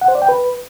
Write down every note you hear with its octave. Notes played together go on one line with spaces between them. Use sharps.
F#5
C5
D5
G5
B4